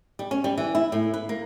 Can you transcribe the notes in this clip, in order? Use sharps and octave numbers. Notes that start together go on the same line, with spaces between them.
G3
C#4
G3
E3
E4
A2
B4
A#3